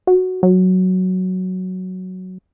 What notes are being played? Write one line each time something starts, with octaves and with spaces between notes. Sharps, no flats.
F#4
F#3